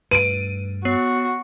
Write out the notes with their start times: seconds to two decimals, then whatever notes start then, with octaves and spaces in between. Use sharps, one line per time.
0.11 G2 A3 B4 D7 D#7
0.85 B3 F#4 C#5 C7